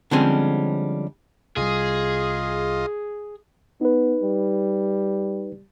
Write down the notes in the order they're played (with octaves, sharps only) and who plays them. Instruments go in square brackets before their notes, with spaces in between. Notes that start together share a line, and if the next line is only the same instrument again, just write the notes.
[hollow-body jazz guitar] D3 F3 G3 G#3 C4 C#4
[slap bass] C2 G3 [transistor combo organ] F4 D#5 [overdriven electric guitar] G#4
[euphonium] B3 [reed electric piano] D#4 B4
[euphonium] G3